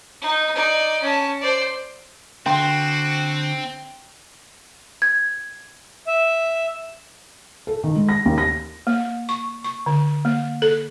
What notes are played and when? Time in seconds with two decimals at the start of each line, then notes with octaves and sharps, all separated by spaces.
0.21 D#4
0.55 D#4 D5
1.02 C#4 A5
1.41 C5 D5
2.46 D3 C4 F#4 G5 C6
5.02 G#6
6.07 E5
7.67 A4
7.84 D#3
7.96 G#3
8.09 A#6
8.25 D#2
8.38 A#6
8.87 A#3
9.29 C#6
9.64 C#6
9.86 D3
10.25 A#3
10.62 A4